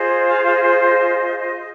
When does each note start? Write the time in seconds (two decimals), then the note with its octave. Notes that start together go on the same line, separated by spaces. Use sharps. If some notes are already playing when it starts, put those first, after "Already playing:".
Already playing: F4 G#4 C5 D#5
0.28 F5
0.45 F5
0.55 D#5
1.39 D#5